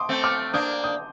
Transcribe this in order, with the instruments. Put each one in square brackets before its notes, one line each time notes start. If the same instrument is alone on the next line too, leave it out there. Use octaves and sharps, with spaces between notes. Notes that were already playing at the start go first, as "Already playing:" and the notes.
Already playing: [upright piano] C6 D6 D#6
[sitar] A3 C4
[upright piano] D6 F6
[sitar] A#3 D4 [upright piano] D#6 G6
[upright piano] D#6 G6